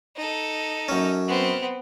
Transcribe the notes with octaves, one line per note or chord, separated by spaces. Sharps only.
D#4 A4
F#2 C#4
B3 C4